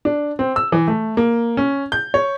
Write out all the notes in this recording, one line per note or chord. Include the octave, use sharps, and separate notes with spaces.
D4
C4
E6
E3
A3
A#3
C#4
G6
C#5